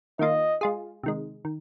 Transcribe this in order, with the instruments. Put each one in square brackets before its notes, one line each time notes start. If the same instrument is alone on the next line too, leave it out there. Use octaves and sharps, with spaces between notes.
[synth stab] D#3 A#3 F4 [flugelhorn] D#5
[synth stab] G#3 F4 G#4
C3 D#3 G#3
D#3